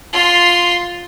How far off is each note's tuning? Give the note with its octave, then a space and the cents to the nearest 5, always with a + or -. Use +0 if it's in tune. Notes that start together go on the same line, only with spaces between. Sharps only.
F4 +5 C6 +0